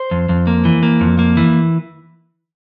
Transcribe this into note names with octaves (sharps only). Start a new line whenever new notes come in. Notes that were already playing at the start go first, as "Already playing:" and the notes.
Already playing: C5
F2
F2
A#3
E3
A#3
F2
A#3
E3